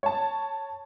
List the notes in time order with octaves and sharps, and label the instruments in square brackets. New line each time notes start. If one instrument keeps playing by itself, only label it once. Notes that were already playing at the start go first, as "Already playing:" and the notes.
[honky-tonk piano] C#5 A5